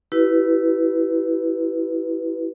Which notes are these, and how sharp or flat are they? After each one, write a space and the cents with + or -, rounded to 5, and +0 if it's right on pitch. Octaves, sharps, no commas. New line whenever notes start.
E4 +0 G4 -40 B4 -5